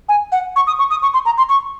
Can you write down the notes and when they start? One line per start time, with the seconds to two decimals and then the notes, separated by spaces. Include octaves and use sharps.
0.09 G#5
0.32 F#5
0.56 C#6
0.67 D#6
0.79 C#6
0.90 D#6
1.02 C#6
1.14 C6
1.26 A#5
1.38 C6
1.49 C#6